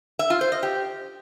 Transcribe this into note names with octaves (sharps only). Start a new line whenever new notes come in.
E5
F4
C5
D#5
G4